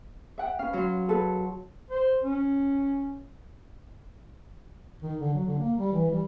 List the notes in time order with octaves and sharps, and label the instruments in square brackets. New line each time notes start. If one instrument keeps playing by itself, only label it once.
[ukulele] E5 F#5 G5
[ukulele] C#4 B4 [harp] F5
[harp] F#3 C6
[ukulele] G#4 A4 B4
[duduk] C5
C#4
D#3
D3
F#3
D3
A#3
G3
E3
G3